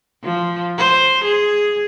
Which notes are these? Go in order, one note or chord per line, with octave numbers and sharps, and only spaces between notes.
F3
C5
G#4